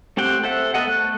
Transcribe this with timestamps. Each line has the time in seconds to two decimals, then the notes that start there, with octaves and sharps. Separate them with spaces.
0.17 A3 C4 G4 F#5 G5
0.43 A4 C5 E5 F#5
0.74 B3 A4 D#5 F#5
0.87 A3 F#6